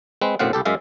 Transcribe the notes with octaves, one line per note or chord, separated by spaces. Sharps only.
G#3 C4 B4
B1 F#2 A2 C4 F5 F#5
C2 G4 A4
F#2 G#3 E5 F5